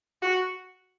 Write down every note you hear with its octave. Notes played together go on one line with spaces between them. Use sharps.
F#4